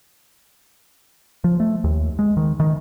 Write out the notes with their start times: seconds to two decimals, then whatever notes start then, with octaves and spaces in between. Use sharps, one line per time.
1.44 F3
1.60 A3
1.84 D#2
2.19 G#3
2.37 D#3
2.60 D#3